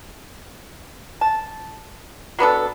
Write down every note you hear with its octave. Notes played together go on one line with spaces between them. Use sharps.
A5
F#3 B3 D4 A4